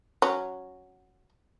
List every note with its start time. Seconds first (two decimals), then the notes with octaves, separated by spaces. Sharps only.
0.22 F#3 C#4